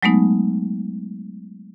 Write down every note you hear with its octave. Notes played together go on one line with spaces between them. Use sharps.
F#3 G#3 A3 B3 D#4